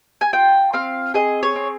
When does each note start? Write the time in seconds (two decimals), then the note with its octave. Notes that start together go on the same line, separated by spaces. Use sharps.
0.21 G#5
0.33 F4 G5
0.73 C4 F5
1.14 G#4 D#5
1.43 C#5
1.56 C4